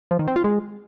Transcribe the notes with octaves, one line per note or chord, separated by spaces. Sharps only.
F3
D#3
C4
F4
G#3